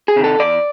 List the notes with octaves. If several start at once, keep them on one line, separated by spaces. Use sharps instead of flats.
G#4
C3 D#3
A4
E2 D5